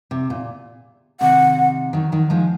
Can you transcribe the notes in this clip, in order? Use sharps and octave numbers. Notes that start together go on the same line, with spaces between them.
C3
A#2
C3 D#3 F#5
D#3 F#3
D#3 F#3
F3 G#3